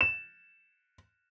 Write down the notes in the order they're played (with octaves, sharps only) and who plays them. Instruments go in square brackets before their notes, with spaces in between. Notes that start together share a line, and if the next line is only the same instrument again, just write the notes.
[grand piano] E7